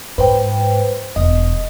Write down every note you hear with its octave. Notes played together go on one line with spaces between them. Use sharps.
G#2 B4 C5 G5
E1 D#5